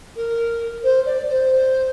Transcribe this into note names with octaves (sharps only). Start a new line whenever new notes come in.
A#4
C5
D5
C5